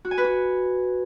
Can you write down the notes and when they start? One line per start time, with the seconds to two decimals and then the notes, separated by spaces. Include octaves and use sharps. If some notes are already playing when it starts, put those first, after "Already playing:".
0.05 F#4
0.11 G#5
0.18 B4
0.24 F#4